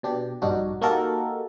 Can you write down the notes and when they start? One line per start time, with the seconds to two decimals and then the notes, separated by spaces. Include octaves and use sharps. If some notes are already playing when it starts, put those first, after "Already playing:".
0.03 B2 D4 G4
0.42 A#1 G2 D4 D#4 F#4
0.81 A#3 D#4 F#4 G4 A4 A#4